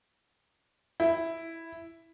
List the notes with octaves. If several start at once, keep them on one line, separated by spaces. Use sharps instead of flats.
E4